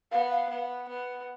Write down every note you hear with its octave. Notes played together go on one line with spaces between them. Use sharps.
B3 F5
F5
B3
B3